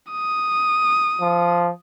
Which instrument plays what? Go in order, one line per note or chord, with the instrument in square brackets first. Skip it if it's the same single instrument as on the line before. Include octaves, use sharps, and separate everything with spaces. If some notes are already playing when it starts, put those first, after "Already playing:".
[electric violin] D#6
[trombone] F3